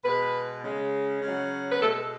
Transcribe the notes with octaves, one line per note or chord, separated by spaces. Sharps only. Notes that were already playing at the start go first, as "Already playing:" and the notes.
B2 G#3 B4
C#3 G#3
C#3 F#3
B4
B2 G#3 A4